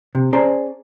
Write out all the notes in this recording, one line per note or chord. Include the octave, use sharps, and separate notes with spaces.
C3
C#4 G#4 C5 D5 A5 A#5